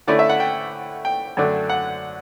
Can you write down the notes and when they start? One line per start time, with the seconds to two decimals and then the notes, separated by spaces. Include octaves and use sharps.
0.07 D3 A3 C#4 E4 D5
0.19 E5
0.29 F#5
0.40 G5
1.05 G5
1.37 F#2 D3 A3 D4
1.69 F#5